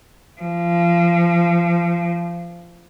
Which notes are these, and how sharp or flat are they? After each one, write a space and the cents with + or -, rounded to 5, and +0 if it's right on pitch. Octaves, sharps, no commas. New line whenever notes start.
F3 -25